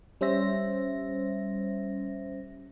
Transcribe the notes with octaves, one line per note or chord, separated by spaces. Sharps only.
G3 C#4 C5 E5 A#6